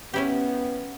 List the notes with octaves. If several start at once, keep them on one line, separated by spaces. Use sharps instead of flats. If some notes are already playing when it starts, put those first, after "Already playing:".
B3 C#4 E4 G4